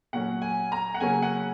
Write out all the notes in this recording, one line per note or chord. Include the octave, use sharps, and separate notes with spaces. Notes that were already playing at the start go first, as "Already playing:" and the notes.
A#2 F#3 C#4 F#5
G#5
A#5
F#5
C#3 F#3 A#3 C#4 G#5
F#5